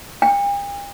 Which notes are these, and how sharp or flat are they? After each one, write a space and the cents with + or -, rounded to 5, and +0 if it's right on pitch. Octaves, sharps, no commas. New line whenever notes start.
G5 +45